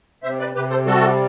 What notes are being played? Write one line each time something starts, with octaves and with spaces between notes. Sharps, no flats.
C3 C5 E5
B4 D5
C3 G4 B4
A4 C5
G3 F#4 A4